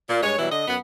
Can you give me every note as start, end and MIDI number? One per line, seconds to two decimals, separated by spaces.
0.09 0.22 46
0.23 0.38 43
0.23 0.38 56
0.23 0.38 73
0.38 0.50 47
0.38 0.50 52
0.38 0.50 54
0.38 0.50 55
0.38 0.50 64
0.51 0.66 50
0.51 0.66 75
0.67 0.76 42
0.67 0.76 59